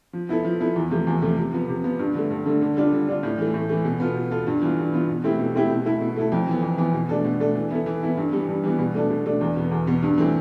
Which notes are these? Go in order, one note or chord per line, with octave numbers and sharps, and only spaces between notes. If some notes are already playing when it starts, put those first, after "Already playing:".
F3
B3 E4 A4
F3
B3 E4 A4
E2
C3 F3 A3
E2
C3 F3 A3
C3
F3 B3
C3
F3 B3
G2
D3 A3
G2
D3 A3
D3
G3 D4 F4
D3
G3 D4 F4
A2
E3 A3
A2
E3 A3
B2
B3 F4 A4
B2
B3 F4 A4
G2
E3 B3 F4
G2
E3 B3 F4
B2
A3 C4 E4 G4
B2
A3 C4 E4 G4
B2
A3 E4 A4
B2
A3 E4 A4
F2
E3 B3
F2
E3 B3
B2
A3 D4 A4
B2
A3 D4 A4
E3
B3 E4 A4
E3
B3 E4 A4
G2
E3 G3 B3
G2
E3 G3 B3
B2
A3 D4 A4
B2
A3 D4 A4
E2
B2 B3
E2
B2 B3
G2
E3 A3 C4